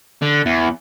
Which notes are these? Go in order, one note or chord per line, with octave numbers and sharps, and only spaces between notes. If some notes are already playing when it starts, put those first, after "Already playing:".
D3
E2